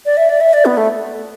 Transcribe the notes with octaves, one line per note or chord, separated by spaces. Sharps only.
D5
E5
D5
E5
D5
B3
A3